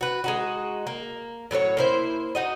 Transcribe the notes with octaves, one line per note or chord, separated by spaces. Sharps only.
F#4 B4
G#3 D#4 F#4
A#3
A2 F#3 E4 C#5
A#3 E4 C5
D#4 F#4 D#5